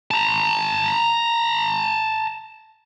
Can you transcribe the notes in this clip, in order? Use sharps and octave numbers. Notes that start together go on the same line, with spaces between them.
A5 A#5